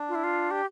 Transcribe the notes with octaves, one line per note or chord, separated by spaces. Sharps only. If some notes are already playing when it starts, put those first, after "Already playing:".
Already playing: D4
F4
E4
F4
G4